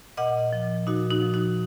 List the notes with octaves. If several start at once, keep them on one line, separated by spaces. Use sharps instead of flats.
A#2 D#5 F#5
F3
A#2 D#4 F#4
D#4 F#4
F3
D#4 F#4